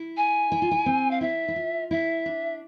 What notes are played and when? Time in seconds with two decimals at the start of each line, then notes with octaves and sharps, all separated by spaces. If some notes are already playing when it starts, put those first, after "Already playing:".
Already playing: E4
0.17 G#5
0.52 E4
0.62 F4
0.71 E4
0.86 C4
1.11 F5
1.21 E4 E5
1.48 E4
1.56 F4
1.91 E4 E5
2.26 D4